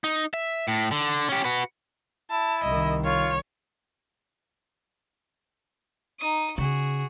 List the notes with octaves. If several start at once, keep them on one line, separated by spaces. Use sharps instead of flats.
D#4
E5
A2
D3
C#4 G4
F#4 B4
E4 A5
C2 D#3 D#5
F4 C#5
D#4 D#6
C#3 F#4 G#4